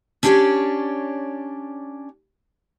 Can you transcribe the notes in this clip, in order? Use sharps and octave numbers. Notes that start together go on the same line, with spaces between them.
C#4 D4 G4 B4 C#5 D5